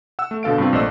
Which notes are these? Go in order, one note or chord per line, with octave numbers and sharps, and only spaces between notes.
F#5 E6
A3
B2 D3 A4 F5 D7
G2 C3 C4 F4
A#1 A3 C5 D5 D#5 E6